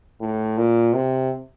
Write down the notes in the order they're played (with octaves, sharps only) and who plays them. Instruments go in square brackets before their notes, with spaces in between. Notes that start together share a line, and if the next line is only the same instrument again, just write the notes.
[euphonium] A2
A#2
C3